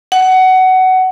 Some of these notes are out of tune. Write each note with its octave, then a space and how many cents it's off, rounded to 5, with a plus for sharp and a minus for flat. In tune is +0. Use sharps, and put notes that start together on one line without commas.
F#5 +20